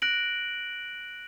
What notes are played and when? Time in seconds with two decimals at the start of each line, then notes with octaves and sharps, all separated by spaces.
0.02 F#6 A#6 D7 F#7